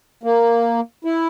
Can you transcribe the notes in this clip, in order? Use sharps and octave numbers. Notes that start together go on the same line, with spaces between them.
A#3
E4